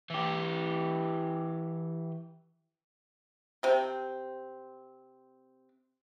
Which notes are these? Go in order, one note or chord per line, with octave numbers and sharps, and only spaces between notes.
E3 G4
C3 C4